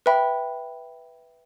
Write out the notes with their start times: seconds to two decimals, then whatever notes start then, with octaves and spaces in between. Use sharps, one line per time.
0.06 B4 E5 G5 B5